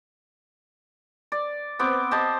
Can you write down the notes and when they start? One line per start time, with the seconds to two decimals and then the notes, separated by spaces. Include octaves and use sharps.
1.32 D5
1.79 B3 C4 D6
2.11 G4 C5 D#5 A5